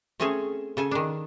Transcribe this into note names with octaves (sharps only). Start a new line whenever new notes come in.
A3 C4 C#4 G#4 A4
C#3 A4 G#5
D#3 D4